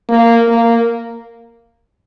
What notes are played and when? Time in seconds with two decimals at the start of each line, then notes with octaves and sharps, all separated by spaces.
0.09 A#3
0.48 A#3